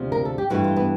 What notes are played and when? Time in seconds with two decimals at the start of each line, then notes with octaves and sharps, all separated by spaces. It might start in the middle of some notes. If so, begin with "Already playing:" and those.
Already playing: D2 C3 F3
0.12 A#4
0.25 A4
0.38 G4
0.50 G2 E3 A3 F#4
0.64 F4
0.76 B3